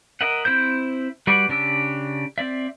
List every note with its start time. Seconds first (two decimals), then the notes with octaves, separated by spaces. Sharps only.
0.21 A#4 D#5 E5 F#5
0.45 C4 E4 C5 G6
1.27 G3 F#4 B4 D5
1.49 C#3 D4 G4 E6
2.38 C4 D5 E5